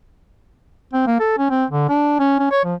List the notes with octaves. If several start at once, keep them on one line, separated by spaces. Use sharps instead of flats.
C4
A#3
A4
C#4
C4
D3
D4
C#4
C#4
C#5
F3